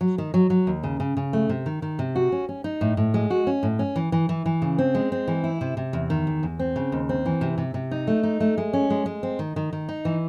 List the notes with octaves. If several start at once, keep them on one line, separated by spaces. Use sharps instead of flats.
F#3
D#3
F#3
F#3
D#2
C#3
C#3
C#3
A3
C3
D#3
D#3
C3
F#4
C#4
C#4
D#4
A2
A2
G#3
F#4
C#4
A2
C#4
E3
E3
E3
E3
C#3
C4
G#3
C4
E3
E4
C3
C3
E2
D#3
E2
E2
C4
C#3
D#2
C4
E3
C3
C3
C3
D#4
A3
D#4
A3
G#3
C#4
G#3
G#3
C4
D#3
D#3
D#3
D#4
E3